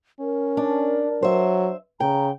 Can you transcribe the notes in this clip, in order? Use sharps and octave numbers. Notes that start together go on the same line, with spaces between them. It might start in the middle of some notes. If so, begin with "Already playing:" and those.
C#4 A#4
D4
F#3 C5 E5
C#3 G5 A#5